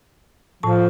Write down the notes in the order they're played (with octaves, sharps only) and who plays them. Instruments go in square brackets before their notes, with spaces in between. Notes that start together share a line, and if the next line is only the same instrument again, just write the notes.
[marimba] A2 A5 [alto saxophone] F3